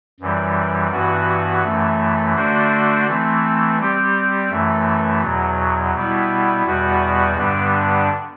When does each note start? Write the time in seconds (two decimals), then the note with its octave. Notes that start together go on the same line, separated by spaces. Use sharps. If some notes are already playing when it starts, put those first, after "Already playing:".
0.20 F#2 E3 G3
0.91 G2 E3 B3 F#4
1.63 F#2 E3 A3
2.35 D3 A3 D4 F#4 C5
3.07 E3 A3 C4
3.79 G3 C4 G4
4.51 F#2 E3 A3
5.22 E2 B2 F#3
5.94 B2 G3 B3 E4
6.65 E2 B2 G3 B3 F#4
7.37 G2 D3 G3 B3 D4